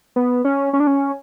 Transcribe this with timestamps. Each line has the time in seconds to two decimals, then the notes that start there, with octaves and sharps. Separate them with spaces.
0.16 B3
0.45 C#4
0.73 C#4
0.80 D4
0.87 C#4